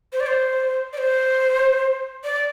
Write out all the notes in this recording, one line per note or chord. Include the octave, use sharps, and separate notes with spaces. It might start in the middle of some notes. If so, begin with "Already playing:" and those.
C5
D5
C5
D5
C5
D5